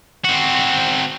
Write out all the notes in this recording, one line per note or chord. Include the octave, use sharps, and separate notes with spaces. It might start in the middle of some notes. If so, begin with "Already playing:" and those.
C4 F#4